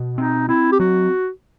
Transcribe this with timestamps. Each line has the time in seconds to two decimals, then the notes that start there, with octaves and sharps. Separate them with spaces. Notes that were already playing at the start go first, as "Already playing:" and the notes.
Already playing: B2
0.18 C4 D#4
0.49 C4 E4
0.72 G4
0.80 F#3 F#4